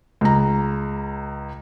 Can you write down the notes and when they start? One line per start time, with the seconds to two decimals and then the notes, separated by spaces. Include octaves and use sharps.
0.21 C#2 A#5